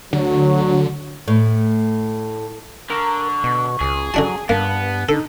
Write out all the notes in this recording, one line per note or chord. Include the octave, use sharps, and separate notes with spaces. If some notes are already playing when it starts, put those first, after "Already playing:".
D2 D3 F#3
A2
D3 A#4 C#6
B2
C#2 G#4
D3 F#3 D4 A5
G2 A#3 B3 A5
D3 D#4 A4